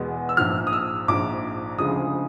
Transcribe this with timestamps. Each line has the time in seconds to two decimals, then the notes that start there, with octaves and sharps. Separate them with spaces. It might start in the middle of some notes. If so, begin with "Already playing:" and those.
Already playing: E2 B2 G#3 B3
0.29 E6
0.37 A#1 G#2 F3 F6
0.67 D#6
0.73 E6
1.08 A#1 G#2 F3 D6
1.78 D2 C#3 F3 G#3 D#6